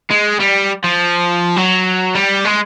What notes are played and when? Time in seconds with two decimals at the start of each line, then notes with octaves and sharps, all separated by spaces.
0.11 G#3
0.40 G3
0.84 F3
1.56 F#3
2.15 G3
2.45 G#3